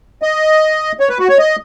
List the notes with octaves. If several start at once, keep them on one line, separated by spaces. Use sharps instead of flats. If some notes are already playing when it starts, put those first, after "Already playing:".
D#5
C#5
B4
F#4
C#5
D#5